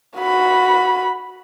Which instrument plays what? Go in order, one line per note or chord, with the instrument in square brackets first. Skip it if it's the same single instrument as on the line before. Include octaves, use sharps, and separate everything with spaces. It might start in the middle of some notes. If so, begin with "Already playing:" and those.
[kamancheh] F#4 B5